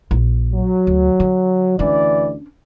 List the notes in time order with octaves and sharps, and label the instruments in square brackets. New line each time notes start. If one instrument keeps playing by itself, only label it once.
[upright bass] A#1
[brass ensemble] F#3
[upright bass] D2
D3
[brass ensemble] D2 E3 D5 [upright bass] C#4 D4